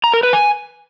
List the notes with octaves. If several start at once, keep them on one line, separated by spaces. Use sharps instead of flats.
A#5
A#4
B4
G#5